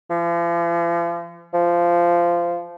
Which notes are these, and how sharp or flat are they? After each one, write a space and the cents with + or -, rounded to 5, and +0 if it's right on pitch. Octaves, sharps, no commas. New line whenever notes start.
F3 -40
F3 -15